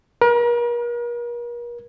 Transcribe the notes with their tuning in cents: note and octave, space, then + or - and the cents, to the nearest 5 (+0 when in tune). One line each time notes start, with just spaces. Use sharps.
A#4 +40